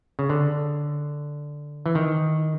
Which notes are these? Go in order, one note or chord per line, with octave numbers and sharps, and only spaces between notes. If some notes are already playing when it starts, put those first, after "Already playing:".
C#3
D3
E3
D#3